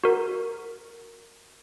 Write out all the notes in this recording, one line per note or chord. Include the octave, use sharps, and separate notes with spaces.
F#4 A#4